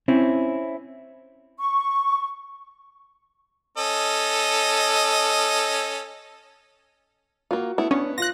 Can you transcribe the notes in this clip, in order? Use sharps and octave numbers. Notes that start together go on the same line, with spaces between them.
C4 C#4 E4
C#6
C#4 A4 D#5
A#3 F4 F#4
A3 B3 E4
B3 C#4 D4
F4 F#6 A#6